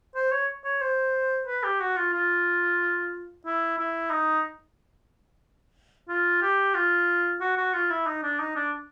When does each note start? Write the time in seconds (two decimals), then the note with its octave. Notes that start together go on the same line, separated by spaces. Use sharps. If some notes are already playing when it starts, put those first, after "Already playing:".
0.15 C5
0.31 C#5
0.64 C#5
0.81 C5
1.47 B4
1.63 G4
1.80 F#4
1.97 F4
2.13 F4
3.45 E4
3.78 E4
4.11 D#4
6.09 F4
6.42 G4
6.75 F4
7.41 F#4
7.57 F#4
7.73 F4
7.90 E4
8.06 D#4
8.23 D4
8.39 D#4
8.56 D4